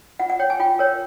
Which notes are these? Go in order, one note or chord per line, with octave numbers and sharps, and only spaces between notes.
F4 F#5
F#5
C#5 G5
G#5
F4 G5
A#4 C#5